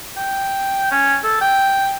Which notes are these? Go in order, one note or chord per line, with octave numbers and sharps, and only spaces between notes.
G5
C#4
A4
G5